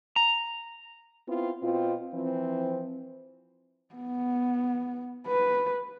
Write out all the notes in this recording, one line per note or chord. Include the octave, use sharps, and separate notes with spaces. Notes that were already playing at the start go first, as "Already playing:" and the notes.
A#5
B3 C4 E4 F4
B2 C4 F4
E3 F3 C4
B3
B4